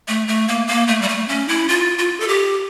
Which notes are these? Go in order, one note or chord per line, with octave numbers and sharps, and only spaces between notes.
A3
A3
A#3
A#3
A3
G3
A3
C#4
E4
F4
F4
A4
G4